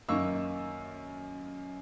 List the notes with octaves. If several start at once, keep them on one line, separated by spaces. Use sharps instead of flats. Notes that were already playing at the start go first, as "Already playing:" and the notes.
F#2 D#3 A#3 D#4 C#6 E6